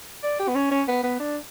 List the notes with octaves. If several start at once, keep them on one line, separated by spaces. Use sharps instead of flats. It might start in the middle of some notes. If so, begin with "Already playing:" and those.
D5
G4
B3
C#4
C#4
B3
B3
D4